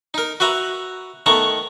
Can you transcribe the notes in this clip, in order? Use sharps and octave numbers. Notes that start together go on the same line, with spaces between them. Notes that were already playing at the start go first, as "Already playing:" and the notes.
D#4 A#4
F#4 B4 E5 A#5
D#3 A3 B3 A#5 C#6